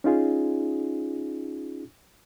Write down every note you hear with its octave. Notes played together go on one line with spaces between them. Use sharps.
C#4 D#4 F4 G#4